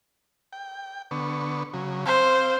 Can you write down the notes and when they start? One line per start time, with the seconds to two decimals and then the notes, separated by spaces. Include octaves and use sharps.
0.53 G5
1.11 D3 B3 C#6
1.74 C#3 F#3
2.06 C4 C5 F5